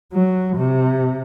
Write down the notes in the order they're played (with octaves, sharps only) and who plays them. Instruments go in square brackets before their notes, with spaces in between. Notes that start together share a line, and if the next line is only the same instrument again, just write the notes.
[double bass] F#3
C3